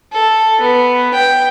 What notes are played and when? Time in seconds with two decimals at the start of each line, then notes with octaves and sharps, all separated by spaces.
0.13 A4
0.61 B3
1.14 G5